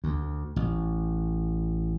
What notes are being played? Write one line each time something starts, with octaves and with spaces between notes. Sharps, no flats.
D2
A1